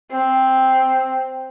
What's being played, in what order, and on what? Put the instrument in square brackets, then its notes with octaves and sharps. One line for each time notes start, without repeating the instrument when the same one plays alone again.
[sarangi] C4